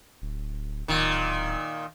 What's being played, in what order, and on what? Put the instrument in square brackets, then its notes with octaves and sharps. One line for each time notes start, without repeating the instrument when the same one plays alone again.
[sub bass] D1
[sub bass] D1 [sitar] A#2 D#3